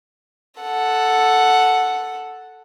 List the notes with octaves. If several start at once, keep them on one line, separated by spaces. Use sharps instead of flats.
A4 F#5